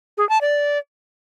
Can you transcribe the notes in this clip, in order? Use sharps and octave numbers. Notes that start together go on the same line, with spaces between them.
G#4
A5
D5